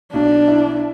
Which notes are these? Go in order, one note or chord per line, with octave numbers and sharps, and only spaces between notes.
B1 D4
E4